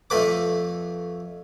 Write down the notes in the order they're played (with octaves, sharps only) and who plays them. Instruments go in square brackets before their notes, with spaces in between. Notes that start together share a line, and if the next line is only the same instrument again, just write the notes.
[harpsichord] F2 A3 B4 D6